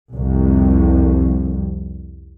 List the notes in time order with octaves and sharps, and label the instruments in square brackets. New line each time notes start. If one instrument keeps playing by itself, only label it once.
[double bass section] C2 F2